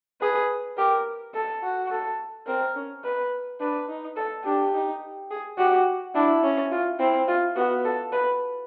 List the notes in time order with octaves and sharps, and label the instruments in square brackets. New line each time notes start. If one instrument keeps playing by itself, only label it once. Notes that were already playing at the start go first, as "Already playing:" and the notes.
[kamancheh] G#4 [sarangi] B4
[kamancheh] G4 [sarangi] A#4
[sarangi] A4
[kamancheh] F#4
[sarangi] A4
[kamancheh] C4 [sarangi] A#4
[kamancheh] C#4
[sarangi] B4
[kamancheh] D4 [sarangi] B4
[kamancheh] D#4
[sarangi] A4
[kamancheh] D4 [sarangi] G4
[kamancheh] D#4
G#4
[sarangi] F#4 [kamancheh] G4
[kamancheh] D4 [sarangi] E4
[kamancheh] C#4
[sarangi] F4
[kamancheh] C4 [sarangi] E4
[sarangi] F4
[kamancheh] B3 [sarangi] F#4
[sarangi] A4
B4